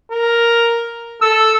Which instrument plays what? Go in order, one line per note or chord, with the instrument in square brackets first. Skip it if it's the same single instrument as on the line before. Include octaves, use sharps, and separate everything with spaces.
[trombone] A#4
[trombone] A4 [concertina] E6